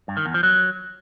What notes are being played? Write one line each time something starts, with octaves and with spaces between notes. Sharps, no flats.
G2
D#3
E2
F3
F#3